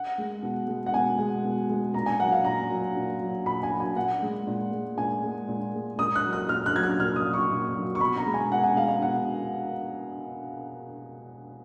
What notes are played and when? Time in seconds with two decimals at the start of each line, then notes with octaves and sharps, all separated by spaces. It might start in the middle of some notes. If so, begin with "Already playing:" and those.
Already playing: F#5
0.18 G#3
0.43 B2
0.67 G#3
0.86 F#5
0.93 B2 G#5
1.19 G#3
1.44 B2
1.70 G#3
1.94 A#2 A#5
2.06 G#5
2.20 F#3 F#5
2.32 F5
2.45 A#2 A#5
2.70 F#3
2.96 A#2
3.20 F#3
3.46 A#2 B5
3.63 G#5
3.71 F#3
3.80 G#5
3.96 A#2 F#5
4.22 G#3
4.47 A#2
4.72 G#3
4.97 A#2 G#5
5.22 G#3
5.48 A#2
5.74 G#3
5.99 A#2 D#6
6.15 F#6
6.24 F#3
6.33 F#6
6.49 A#2 F6
6.66 F#6
6.75 F#3 G#6
6.83 F#6
7.00 A#2 F6
7.16 D#6
7.25 F#3
7.33 C#6
7.51 A#2
7.75 F#3
7.95 C#6
8.00 B2 B5
8.17 A#5
8.26 G#3
8.34 G#5
8.51 B2 F#5
8.63 G#5
8.76 G#3 F5
8.89 F5
9.02 B2 F#5